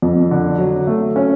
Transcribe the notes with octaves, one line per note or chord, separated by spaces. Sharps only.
F2
D3
F#3
A3
C#4